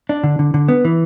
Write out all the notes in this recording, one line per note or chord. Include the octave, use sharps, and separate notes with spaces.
D4
D3
D3
D3
B3
E3